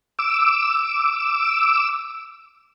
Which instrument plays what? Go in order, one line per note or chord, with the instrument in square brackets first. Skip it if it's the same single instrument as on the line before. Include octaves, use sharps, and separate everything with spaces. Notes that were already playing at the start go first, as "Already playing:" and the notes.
[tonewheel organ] D6 E6